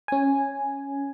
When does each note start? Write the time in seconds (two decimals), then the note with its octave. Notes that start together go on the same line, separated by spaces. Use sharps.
0.08 C#4 G#5